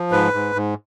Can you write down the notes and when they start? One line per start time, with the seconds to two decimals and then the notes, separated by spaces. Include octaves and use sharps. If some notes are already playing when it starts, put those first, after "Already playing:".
Already playing: F3
0.12 G#2 B4
0.34 G#2
0.56 G#2